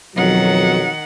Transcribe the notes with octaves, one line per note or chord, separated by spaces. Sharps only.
B1 F2 D#3 F#3 F#5